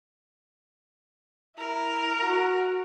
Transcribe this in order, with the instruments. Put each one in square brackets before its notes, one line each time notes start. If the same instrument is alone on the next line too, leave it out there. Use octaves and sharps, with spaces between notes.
[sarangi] E4 [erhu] A#4
[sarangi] F#4